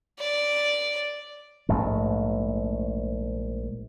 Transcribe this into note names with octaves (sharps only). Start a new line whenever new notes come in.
D5
A#1 G#2 A3